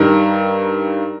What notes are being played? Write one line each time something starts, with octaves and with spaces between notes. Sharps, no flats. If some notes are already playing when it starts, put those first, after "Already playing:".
Already playing: G2 D#3 G3 A#4